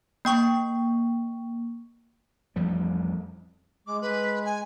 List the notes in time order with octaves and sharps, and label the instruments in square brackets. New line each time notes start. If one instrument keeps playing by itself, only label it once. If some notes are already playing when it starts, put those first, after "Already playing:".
[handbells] A#3 G5 C#6
[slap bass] A1 F2 F3 G3
[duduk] G#3 [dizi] D6
[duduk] G#3 [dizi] B4
[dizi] G#5